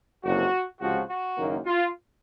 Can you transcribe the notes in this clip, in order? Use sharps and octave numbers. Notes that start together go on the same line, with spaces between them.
F#1 F2 C3 F#3 F#4
C#2 C3 F3 F#4
F#4
F#1 F#2 D#3 A#3
F4